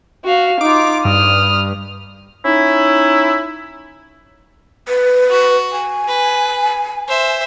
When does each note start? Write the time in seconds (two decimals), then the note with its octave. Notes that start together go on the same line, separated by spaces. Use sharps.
0.25 F#4 F5
0.61 D#4 F4 D6
1.05 G2 D#6 F6
2.45 C#4 D#4 E4
4.88 B4
5.31 F#4
5.72 G#5
6.08 B4
7.08 C5 E5